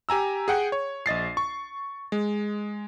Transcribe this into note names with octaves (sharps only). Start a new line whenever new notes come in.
G4 G#5 A#5 E6
G#4 F#5 G5
C#5
A#1 D#5 A6 C7
C#6
G#3